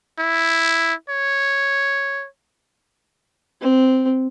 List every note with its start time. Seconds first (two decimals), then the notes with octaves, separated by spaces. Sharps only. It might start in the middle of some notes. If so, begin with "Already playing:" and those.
0.19 E4
1.09 C#5
3.61 C4